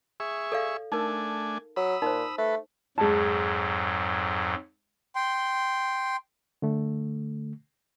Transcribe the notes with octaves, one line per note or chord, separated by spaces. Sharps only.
G#4 E5 C#6
A4 D5 F5
A3 D4 D#4 A#4 G#5
F#3 B5 D#6 E6
A#2 D#4 C5
A3 A4 B4
F2 G#2 F#3 G#3 A5
G5 C6
D3 A3